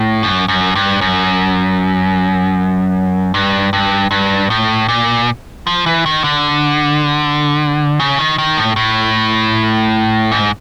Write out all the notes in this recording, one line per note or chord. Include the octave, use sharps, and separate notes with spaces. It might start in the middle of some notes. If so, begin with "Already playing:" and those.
Already playing: A2
F#2
F#2
G2
F#2
G2
G2
G2
A2
A#2
F3
E3
D#3
D3
C#3
D#3
D#3
A2
A2
G#2